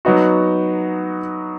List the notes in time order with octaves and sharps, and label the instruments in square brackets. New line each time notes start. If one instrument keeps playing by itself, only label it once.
[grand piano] F#3 B3 D#4 F#4